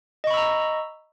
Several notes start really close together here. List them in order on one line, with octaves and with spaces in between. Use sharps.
D#5 C#6 B5 E6 A#5